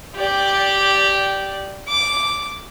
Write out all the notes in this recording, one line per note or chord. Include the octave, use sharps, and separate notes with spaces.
G4 D5
D6